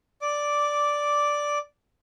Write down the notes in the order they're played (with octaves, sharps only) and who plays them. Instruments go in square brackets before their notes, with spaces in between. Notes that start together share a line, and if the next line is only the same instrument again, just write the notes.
[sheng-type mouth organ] D5 D6